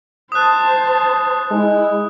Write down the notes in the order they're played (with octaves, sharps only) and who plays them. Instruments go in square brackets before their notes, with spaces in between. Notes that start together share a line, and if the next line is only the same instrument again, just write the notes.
[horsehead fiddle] C5 A5 [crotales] D#6 F#6
[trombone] G#3 [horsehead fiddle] E4